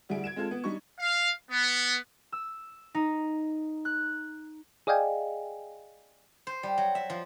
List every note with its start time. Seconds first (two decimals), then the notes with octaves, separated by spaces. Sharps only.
0.09 D2 G3 E4 G#4 D7
0.24 G#6 D7 E7
0.36 G#3 C4 F4 A4
0.51 B3
0.64 G3 D4 D#4 C#6
0.99 F5
1.50 B3
2.32 E6
2.94 D#4
3.85 F#6
4.87 G#4 D5 D#5 F5 G5 G#5
6.47 C5
6.63 G3
6.78 F#3
6.95 E5
7.10 F3